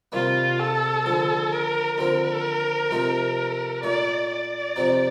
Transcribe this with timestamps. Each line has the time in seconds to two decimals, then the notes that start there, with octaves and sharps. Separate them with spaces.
0.12 C2 C3 D#3 G3 A#3 F4
0.59 A4
1.06 D#2 D3 F3
1.52 A#4
1.98 D#2 D3 F3 C4 A#4
2.91 C3 F3 A3 C4 D#4
3.83 A#2 A3 D#4 D5
4.30 D5
4.76 F2 C3 F3 C4 D#4